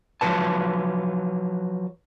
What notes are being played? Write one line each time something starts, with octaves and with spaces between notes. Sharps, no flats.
F3 F#3 B4 A5